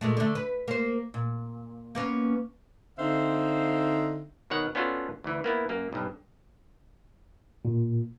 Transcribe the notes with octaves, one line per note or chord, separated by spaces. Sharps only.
A#2 G#3 A3
D3 A3
B4
A#3 C5
A#2
A#3 B3 C#4
D3 C4 D#4 C5 E5 F5
B2 D#3 C#5 F#5
B3 C#4 D4 F4 F#4 A4
D2 E3
A#3 B3 E4
F#2 A#3
B1 G2
A#2